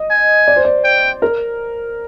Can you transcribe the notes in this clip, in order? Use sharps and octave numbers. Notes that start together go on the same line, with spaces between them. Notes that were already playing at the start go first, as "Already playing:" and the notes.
Already playing: D#5
G#5
D5
C5
D5
G5
A#4